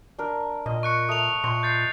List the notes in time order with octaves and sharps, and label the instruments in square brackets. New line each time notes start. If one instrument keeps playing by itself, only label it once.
[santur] D4 A#4
[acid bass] A#2 [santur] D#5
[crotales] C#6 F#6 C#7
[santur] A3 [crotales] D#6 F7
[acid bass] A#2 [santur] C6
[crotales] G6 A6 C7